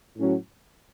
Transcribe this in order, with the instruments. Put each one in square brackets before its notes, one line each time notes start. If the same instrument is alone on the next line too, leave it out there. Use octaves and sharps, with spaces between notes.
[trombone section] A2 F#3 C#4 F#4